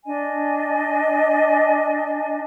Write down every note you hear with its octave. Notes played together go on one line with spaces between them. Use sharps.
D4 D#5 G#5